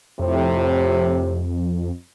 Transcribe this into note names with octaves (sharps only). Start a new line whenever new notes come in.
F2 A2 C3